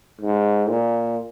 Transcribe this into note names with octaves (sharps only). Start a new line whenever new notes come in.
G#2
A#2